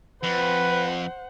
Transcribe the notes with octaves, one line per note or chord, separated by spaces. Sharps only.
F2 B4 C5 F#5